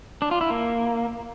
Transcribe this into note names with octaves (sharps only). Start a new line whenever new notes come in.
D4
F4
E4
A#3